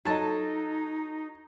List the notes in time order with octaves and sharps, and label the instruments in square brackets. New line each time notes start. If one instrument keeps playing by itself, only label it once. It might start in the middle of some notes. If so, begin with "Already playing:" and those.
[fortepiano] F#3 A5 [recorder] D#4 [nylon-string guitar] F4 A4 D#5